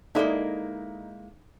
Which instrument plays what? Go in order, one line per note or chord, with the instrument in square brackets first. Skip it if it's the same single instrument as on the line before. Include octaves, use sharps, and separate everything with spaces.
[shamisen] D3 A4 [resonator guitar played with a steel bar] G#3 A#3 E4 [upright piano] D#4